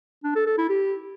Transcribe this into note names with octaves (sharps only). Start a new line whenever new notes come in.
D4
A4
A4
E4
G4